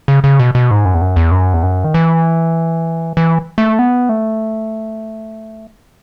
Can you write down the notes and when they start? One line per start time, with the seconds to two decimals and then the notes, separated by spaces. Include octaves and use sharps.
0.08 C#3
0.24 C#3
0.40 B2
0.55 B2
0.71 G#2
0.85 F#2
0.95 E2
1.01 F#2
1.16 E2
1.31 F#2
1.54 E2
1.63 F#2
1.84 D#3
1.94 E3
3.17 E3
3.58 A3
3.79 B3
4.09 A3